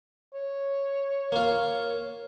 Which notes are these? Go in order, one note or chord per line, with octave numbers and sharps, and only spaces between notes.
C#5
A#3 F4